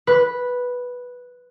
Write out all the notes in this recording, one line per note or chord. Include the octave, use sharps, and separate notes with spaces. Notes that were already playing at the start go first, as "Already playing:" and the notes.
B4